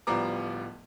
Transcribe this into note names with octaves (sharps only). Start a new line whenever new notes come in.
D1 F3 G3 B3 A#5 D6